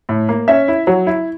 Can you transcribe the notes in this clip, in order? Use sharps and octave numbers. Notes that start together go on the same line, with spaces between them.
A2
A#3
C#4 E5
E4
F#3
E4